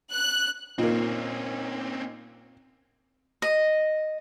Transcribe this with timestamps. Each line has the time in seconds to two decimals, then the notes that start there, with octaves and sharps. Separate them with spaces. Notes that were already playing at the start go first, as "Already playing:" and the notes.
0.12 F#6
0.78 A#2 A#3 C4 C#4 D#4
3.42 D#5